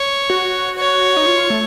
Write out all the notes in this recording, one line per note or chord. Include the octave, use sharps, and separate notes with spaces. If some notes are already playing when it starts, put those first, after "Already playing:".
Already playing: C#5
F#4
C#5
D#4
F4
A3